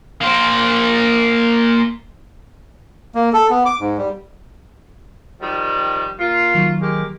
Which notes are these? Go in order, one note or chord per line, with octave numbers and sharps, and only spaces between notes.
A#3 C5
A#3
A4
B3
D6
G#2
G3
D#3 F3 G3
A#3 F4
D#3 F#3
G#3 A#3 G4